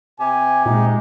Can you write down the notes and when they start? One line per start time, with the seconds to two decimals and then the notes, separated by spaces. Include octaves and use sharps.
0.20 C3 G4 G#5
0.66 A#2 G#3 D#4